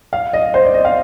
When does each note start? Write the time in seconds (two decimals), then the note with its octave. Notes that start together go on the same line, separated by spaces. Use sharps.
0.13 F5
0.33 D#5
0.54 C5
0.64 D5
0.74 D#5
0.85 F5